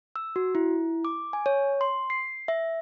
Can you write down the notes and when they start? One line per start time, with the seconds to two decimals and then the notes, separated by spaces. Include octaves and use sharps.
0.16 E6
0.36 F#4
0.55 E4
1.05 D6
1.33 G#5
1.46 C#5
1.81 C6
2.10 C7
2.48 E5